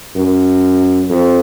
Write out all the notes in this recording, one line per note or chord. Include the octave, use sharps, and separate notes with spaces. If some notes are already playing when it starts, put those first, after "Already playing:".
F#2
F2